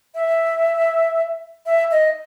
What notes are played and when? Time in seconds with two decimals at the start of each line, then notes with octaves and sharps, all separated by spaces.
0.15 E5
1.66 E5
1.91 D#5